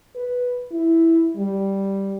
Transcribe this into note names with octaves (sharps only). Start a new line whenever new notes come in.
B4
E4
G3